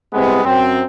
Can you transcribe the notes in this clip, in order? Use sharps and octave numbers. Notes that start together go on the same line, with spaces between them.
C2 C3 G#3 B3
F#2 C4